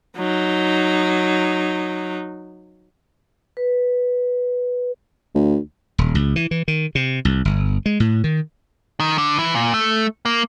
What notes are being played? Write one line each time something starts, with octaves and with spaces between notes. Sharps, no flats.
F#3 D#4
B4
D2
D#1
C#2
E3
E3
D#3
C3
C2
G1
G#3
A2
D#3
D#3
D3
E3
A#2
A3
A#3